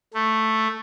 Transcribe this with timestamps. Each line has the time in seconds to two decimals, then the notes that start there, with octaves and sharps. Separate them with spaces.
0.14 A3